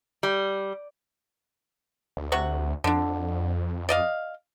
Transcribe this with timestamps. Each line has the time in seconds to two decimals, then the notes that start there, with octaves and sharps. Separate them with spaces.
0.23 G3
2.17 D2
2.32 C3 F#5 C#6
2.84 F2 D3 D4
3.89 D5 D#5 F5